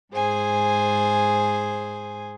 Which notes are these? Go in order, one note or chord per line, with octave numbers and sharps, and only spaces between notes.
G#2 G#4 C5 G#5